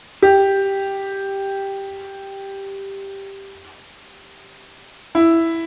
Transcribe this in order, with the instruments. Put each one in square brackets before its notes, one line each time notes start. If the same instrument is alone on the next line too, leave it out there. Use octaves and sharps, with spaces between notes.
[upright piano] G4
E4